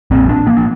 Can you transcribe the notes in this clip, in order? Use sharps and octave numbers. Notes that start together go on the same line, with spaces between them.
A#1 A#2 C4
D4
A#3
D4